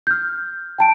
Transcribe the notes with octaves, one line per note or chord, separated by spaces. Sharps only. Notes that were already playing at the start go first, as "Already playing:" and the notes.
F6 G6
G5 A5 D7